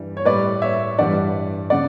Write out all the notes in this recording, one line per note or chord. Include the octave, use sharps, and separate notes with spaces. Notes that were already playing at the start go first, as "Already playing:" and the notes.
Already playing: G2 E3 G3
C#5
A2 G3 B4 D5
C#5 E5
G2 E3 G3 D5 F#5
C#3 D5 F#5